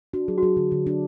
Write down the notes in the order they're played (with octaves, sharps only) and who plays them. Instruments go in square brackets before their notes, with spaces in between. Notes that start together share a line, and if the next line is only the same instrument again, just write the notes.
[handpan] D4 [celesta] F#4
[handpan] F#3 [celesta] G#4
[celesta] F#4
[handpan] F#3 [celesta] G#4
[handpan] D3
D3
D4